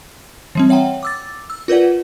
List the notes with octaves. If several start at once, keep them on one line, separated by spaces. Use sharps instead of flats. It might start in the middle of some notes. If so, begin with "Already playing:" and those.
E3 G3 C4
C#5 E5 F#5 G5 A#5
D6 E6 A6
E6
F4 A#4 B4 D5 F#5